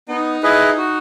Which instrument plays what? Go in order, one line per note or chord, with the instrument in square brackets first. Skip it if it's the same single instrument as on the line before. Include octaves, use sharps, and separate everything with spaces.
[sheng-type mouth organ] B3 [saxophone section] D#4
[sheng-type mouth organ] E4 G#4 B4 D#5
F#4